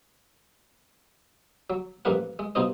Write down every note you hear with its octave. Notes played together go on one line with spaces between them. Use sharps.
F#3
A1 G2 F3 A#3 B4 F#5
G#3
G2 B2 B3 D#4 C5 D#5